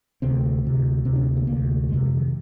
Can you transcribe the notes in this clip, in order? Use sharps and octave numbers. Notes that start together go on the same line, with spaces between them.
D2 C3 C4
D2 C3
D2 C3 C4
D4
A#3
D2 C3 A#3
F2 C3 G#3
F3
D#3